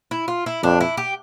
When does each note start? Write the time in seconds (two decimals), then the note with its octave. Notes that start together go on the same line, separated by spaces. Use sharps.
0.11 E4
0.28 F4
0.46 E4
0.63 F2 D4
0.81 E4
0.97 G4